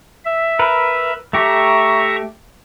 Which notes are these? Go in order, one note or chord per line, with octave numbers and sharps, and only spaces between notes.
E5
A#4 B4
A3 G4 E5 A#5 C#6